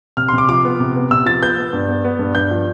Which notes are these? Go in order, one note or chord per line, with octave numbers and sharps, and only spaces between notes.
C3 F6
C6
C3 D6
F3 D6
B3
C3
B3
C3 E6
F3 A6
B3 G6
B3
G2
B3
B3
G2
G2 G6
F3